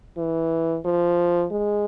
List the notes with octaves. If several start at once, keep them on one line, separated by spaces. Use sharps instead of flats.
E3
F3
G#3